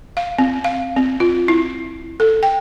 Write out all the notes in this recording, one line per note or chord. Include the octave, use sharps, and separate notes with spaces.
F5
C4
F5
C4
F4
E4
A4
G5